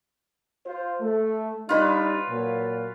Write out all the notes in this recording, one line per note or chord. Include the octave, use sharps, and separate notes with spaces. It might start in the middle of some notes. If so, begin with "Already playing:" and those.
F4 C5
A3
G3 D4 D#4 F4 B4 C#5
A#2 F#3